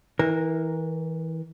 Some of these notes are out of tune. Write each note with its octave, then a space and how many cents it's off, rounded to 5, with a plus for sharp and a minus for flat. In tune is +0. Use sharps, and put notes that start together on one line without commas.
E3 -25 A#4 +0